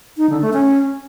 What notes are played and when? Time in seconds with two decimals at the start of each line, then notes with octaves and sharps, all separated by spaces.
0.18 D#4
0.30 D3
0.41 A3
0.53 C#4